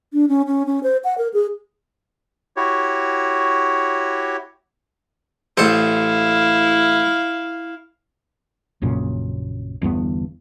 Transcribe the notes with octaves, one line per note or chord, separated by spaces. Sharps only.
D4
C#4
C#4
C#4
C5
F#5
A#4
G#4
E4 F#4 G4 C#5
A1 E4 A4 C5 F5
A#1 F#2 A#2 C#3
G1 E2 G2 B3